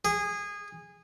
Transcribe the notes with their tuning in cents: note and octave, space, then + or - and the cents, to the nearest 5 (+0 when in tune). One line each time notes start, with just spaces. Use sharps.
G#4 -20